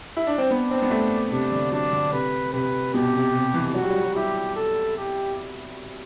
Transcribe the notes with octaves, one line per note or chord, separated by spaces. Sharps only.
E4
D4
C4
B3 D4
C4
B3
A3
C3 D4
D3
F#3 D4
D3
C3 B4
C3 B4
B2 G4
C3
C3
E3
F#3 F#4
G3
F#3
G3
F#3
E4 G4
A4
G4